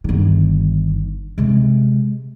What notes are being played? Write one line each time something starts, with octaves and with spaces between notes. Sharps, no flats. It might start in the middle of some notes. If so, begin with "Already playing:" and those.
G1 D#3
C3 G#3